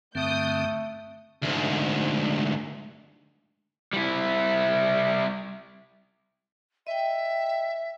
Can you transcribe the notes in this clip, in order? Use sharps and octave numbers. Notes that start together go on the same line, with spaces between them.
G2 D3 A3 C4 D#6 G6
D2 G#2
G3 E4
D#5 E5 G5